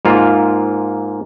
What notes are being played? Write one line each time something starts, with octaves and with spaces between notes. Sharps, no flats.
G#2 A#3 F4